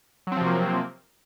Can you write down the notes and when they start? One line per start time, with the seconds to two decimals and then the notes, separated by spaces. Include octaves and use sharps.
0.27 F#3
0.32 C4
0.37 F3
0.41 C3
0.46 A#3